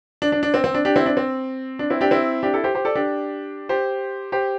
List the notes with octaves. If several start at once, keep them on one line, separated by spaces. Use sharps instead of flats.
D4
D4
D4
C4
C4
D4
D4 G4
C4 E4
D4
C4
D4
C4 E4
D4 G4
C4 E4
D4 G4
E4 A4
G4 C5
G4 C5
A4 D5
D4 G4
G4 C5
G4 C5